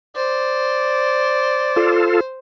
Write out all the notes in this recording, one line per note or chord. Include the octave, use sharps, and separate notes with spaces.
C5 D5
F4 A4